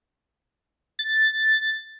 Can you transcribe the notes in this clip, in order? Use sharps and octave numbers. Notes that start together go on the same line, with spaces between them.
A6